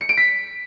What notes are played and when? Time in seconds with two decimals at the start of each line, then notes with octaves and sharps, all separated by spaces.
0.01 C#7
0.09 D7
0.17 B6